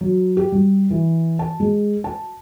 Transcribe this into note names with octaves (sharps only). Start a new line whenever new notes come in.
F#3
G4
G3
E3
A5
G#3
A5